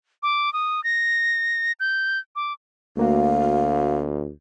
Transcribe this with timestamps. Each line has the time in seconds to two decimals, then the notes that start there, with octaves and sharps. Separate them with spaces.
0.23 D6
0.53 D#6
0.84 A#6
1.80 G6
2.36 D6
2.97 D2 A3 A#3 F#4 F5